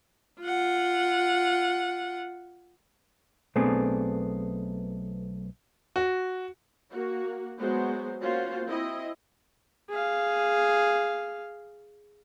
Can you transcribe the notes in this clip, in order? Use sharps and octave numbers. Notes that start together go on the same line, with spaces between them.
F4 F#5
B1 A3 B3 C4 D4 G#4
F#4
A#3 F#4
F#3 G#3 B3 F#4 C5
A#3 C#4 F4 F#4 C5
C4 E4 D#5
G#4 F5